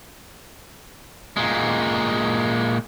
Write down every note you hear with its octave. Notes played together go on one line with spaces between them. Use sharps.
A#2 G#3